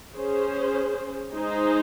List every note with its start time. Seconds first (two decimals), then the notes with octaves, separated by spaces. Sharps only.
0.15 C#4 G#4 C5
1.34 G#3 D#4 G#4 C5